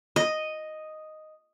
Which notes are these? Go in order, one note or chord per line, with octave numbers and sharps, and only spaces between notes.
D#5